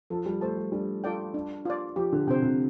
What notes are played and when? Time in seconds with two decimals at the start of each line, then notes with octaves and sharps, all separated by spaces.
0.10 F3 A4
0.26 G3
0.41 A3 C5 A5
0.57 G3
0.72 G3 D4
1.04 F4 A4 D5 G5
1.34 D4
1.65 F4 D5
1.96 F3 G4
2.12 D3
2.27 C3 C5 G5
2.42 C3